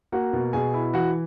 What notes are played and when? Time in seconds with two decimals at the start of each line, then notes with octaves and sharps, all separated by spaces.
0.12 A#3 F#4 F#5
0.33 B2
0.53 B2 G#4 G#5
0.74 E4
0.94 E3 F#4 F#5